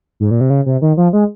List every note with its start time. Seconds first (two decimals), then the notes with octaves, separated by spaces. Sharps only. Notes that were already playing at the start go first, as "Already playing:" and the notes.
0.20 G#2
0.31 A#2
0.41 C3
0.50 C#3
0.66 C3
0.82 D#3
0.97 F3
1.13 G#3